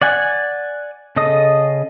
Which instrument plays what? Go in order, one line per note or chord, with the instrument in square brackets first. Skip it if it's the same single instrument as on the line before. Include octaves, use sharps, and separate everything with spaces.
[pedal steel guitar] D5 F#5 G#5
C#3 A4 D#5 D#6